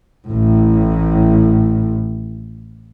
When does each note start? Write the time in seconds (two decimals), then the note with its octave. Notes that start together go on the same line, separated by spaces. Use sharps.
0.27 A1 A2